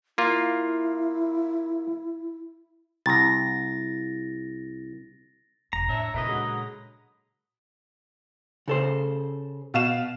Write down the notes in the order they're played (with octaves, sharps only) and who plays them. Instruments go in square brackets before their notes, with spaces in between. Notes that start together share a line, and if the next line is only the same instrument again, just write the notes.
[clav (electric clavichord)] A#3 F4 [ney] E4
[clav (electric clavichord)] C2 [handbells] A6 A#6
[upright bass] F1 [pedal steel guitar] A#5
[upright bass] A2 [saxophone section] D4 C#5 E5
[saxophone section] F2 E3 D#4 [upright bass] A#2 C#3 [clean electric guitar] A#4 B4 D#5
[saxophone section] D3 F#3 G#3
[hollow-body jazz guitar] C#3 A4 C5
[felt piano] B2 F5 E7